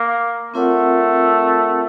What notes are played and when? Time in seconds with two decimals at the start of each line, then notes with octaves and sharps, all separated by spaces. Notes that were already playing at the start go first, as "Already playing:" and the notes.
Already playing: A#3
0.54 A3 C4 F4 A#4 C#5 F#5